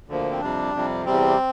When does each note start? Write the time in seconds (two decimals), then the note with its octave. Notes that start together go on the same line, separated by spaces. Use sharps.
0.08 D2 D3 F3 A#3
0.31 C4
0.41 F2 C3 G3 D4
0.74 F2 C3 G3
1.06 E2 C3 G3 C4